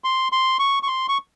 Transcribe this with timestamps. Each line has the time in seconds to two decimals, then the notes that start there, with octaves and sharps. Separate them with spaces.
0.04 C6
0.32 C6
0.59 C#6
0.83 C#6
0.88 C6
1.09 C#6